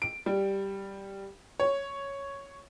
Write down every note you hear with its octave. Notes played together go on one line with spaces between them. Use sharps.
D7
G3
C#5